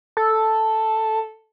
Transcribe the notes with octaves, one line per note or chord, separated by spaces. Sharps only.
A4